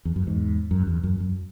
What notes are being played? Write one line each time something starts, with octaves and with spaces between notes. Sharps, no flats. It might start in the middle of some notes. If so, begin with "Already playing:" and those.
E2
F#2
E2 G#2
F#2
E2
F#2
F#2